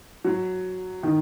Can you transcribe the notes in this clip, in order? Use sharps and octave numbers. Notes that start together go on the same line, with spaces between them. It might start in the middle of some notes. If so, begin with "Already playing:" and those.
F#3
D#3